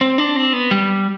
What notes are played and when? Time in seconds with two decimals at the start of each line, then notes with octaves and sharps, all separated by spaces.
0.01 C4
0.18 D4
0.36 C4
0.53 B3
0.71 G3